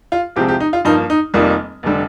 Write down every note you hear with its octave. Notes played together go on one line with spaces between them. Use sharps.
F4
C2 C3 F3 G#3 C4 G4
G4
D#4
F4
G2 F3 A#3 D#4
D#4
F1 F2 D#3 G3 A#3
F1 D3 G3